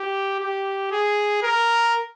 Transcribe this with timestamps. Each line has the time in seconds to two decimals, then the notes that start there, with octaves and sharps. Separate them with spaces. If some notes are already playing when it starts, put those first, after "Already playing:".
Already playing: G4
0.40 G4
0.91 G#4
1.43 A#4